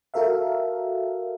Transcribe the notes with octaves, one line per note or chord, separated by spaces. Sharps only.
F#4 A4 A#4 E5 F5